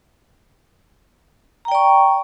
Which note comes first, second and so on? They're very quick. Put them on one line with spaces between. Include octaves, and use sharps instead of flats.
A#5 G5 D5 C#6